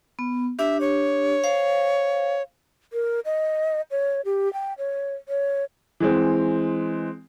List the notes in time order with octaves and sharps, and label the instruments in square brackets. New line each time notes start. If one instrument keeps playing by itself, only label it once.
[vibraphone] B3
[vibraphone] D4 G4 [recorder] E5
[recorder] C#5
[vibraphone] C5 F5
[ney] A#4
D#5
C#5
G4
G5
C#5
C#5
[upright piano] E3 G#3 C4